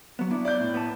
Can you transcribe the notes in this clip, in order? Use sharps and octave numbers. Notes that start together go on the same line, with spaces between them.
F#3 B3
B3 D4 E4
D5 G6
A2
B3 D5 A5